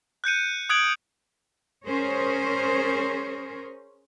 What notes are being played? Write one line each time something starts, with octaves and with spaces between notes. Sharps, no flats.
F#6 G6 C#7 D#7
D#6 F#6 G#6 D7 F#7
C#4 G#4 A#4 C5 C#5